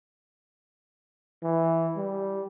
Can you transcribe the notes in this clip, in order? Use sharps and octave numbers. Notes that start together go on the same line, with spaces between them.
E3
G3